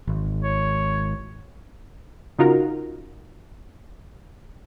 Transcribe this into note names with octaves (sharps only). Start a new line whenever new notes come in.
G#1
C#5
C#3 D#4 F4 F#4 A#4